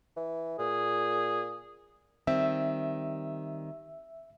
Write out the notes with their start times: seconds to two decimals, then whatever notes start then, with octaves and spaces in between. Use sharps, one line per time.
0.17 E3
0.59 A#2 G#4
2.27 D#3 G3 C4 E5